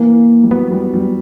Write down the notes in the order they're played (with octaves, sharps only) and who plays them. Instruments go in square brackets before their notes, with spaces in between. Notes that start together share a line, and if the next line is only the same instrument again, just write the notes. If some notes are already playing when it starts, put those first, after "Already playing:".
Already playing: [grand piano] E3 [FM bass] A#3
[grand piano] G3
[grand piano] F#3 [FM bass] B3
[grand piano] G3
G3